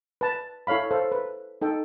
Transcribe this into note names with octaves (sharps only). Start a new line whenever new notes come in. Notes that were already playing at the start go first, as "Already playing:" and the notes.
B4 A5
E4 A4 C#5 F5 B5
A4 C5 F5
B4
D#4 A4 G5